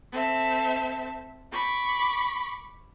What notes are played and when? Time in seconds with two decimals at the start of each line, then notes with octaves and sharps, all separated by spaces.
0.12 C4 A4 E5
1.50 B5 C#6 D6